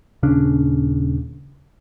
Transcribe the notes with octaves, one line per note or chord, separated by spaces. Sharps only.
D#1 C#3 C#4 D4